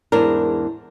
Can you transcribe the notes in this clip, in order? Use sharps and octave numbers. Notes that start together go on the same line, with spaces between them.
E2 G#2 D4 A#4